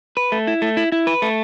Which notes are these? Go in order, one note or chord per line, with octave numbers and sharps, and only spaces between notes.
B4
A3
E4
A3
E4
E4
B4
A3